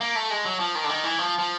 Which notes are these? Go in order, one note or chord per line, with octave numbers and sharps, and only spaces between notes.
A#3
A3
G#3
F#3
F3
D#3
D3
D#3
E3
F3
F3